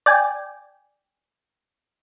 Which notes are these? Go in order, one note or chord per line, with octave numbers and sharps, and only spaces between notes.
D5 G5 G#5